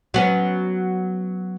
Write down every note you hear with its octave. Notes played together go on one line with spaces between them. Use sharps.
F#3 B3 C#4